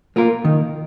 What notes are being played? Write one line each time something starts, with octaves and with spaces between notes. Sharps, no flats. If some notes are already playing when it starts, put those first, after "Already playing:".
A#3 F4 A#4
D#3